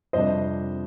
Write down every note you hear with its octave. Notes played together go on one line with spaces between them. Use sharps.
F2 C3 G3 D4 C5 D#5